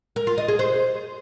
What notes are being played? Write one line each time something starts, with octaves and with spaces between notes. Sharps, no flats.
A#4
F4
D#5
G#4
C5